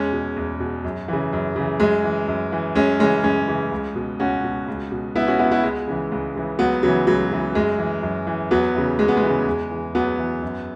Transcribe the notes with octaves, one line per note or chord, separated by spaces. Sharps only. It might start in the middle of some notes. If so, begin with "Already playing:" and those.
Already playing: E2 G#3 C#4
B2
E2
B2
F#2
C#3 E3
F#2
C#3 E3
F#2 G#3
E3
F#2
E3
F#2 G#3 C#4
C#3 E3 G#3 C#4
F#2 G#3 C#4
C#3 E3
C#2
B2
C#2 C#4 F#4
B2
C#2
B2
C#2 B3 E4
C#4 F#4
B2 B3 E4
B3 E4
C#2 G#3
C#3 E3
C#2
C#3 E3
C#2 F#3 B3
C#3 E3 F#3
C#2 F#3
C#3 E3
F#2 G#3
E3
F#2
E3
E2 F#3 B3
C#3 E3
E2 G#3
B3
G#3
C#3 E3
E2
E3
E2 F#3 B3
E3
F#2